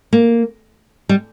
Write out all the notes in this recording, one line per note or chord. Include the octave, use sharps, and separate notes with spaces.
A#3
G3